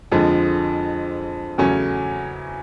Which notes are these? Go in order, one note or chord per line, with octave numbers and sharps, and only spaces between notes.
F2 D3 F3 G#3
E2 C#3 F#3 A3 C#4